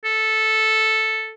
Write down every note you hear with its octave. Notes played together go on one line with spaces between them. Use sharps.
A4